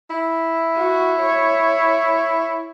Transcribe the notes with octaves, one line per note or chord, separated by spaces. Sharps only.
E4
F#4
C#5